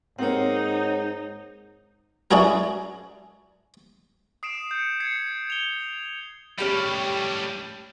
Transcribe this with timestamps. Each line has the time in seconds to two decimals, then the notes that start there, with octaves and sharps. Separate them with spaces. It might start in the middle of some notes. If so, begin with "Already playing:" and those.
0.19 G#2 A#3 C4 D#4 C#5 F#5
2.31 C#4 D4 E4 F#4 G#4 A#4
4.43 D#6 C7 D7 E7
4.71 G6 C#7
5.00 G#6 C7 C#7
5.50 F7 G7
6.58 A2 G3 C#4 G4 B5